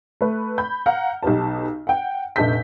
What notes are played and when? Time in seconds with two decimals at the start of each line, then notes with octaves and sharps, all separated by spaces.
0.21 A3 B4
0.58 B5 G6
0.86 F5 F#5 A#5 F6
1.23 B1 D#4 G4 B4 A5
1.87 F#5 G5
2.36 F1 A#1 A4 D#5 G6 B6